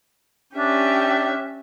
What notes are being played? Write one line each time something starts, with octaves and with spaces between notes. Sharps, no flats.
C#4 D4 G4 E5